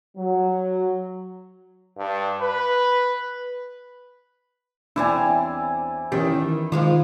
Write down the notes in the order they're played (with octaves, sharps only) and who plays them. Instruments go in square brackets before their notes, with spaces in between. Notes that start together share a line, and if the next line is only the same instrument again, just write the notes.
[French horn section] F#3
[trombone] G2
B4
[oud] E2 C4 C#5 [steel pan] D4 [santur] E4 D5 G#5
[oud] D#3 [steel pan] E3 C#4 G4
[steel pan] D#3 [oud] F3 G#3 F4